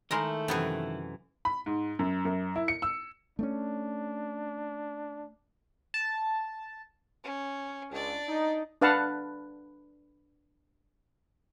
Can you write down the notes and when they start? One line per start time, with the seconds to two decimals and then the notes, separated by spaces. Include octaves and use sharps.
0.11 D#3 G#3 A3 E4 A#4 D#5
0.48 F#2 C3 E3 B3
1.45 B5
1.66 G#2
1.99 F#2
2.25 F#2
2.56 E4
2.68 C#7
2.82 E6
3.39 A3 B3 C#4 D4
5.94 A5
7.24 C#4
7.92 C#2 D4 D5
8.28 D#4
8.81 D4 B4 F5 F#5 A5